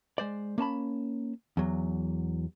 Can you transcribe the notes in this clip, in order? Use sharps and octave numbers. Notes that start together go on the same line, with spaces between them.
G#3 C5 D5
A#3 C#4 A5 B5
E2 F#3